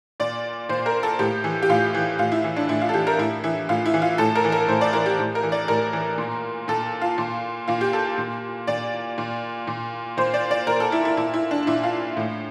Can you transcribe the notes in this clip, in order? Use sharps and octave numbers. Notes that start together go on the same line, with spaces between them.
A#2 D5
A#2 C5
A#4
A4
A2 G4
E3
G4
A2 F4
E3
A2 F4
E4
E3
D4
A2 E4
F4
A4
E3 G4
A#4
A2 E4
E3 E4
A2 F4
E4
E3
F4
A2 A4
A#4
E3
A#4
A2 C5
D5
E3 A#4
G4
A2
A#4
E3
D5
A2 A#4
E3
A#2
A#2 A4
F4
A#2
A#2 F4
G4
A4
A#2
A#2 D5
A#2
A#2
A#2 C5
D5
D5
A#2 A#4
A4
E4
E4
A#2 E4
E4
D4
A#2 E4
F4
A2